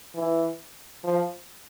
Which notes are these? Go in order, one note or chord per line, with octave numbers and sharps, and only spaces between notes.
E3
F3